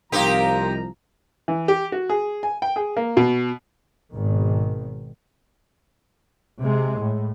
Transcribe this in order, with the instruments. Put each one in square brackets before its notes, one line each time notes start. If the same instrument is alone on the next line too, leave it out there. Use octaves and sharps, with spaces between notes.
[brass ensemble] C2 F3 A#5 [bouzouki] A#3 C4 [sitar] D#4 G4 A#4
[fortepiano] E3
G4
F#4
G#4
G#5
G5
G#4
A#3
B2
[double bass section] G#1 B2 D#3
C3 G#3
A2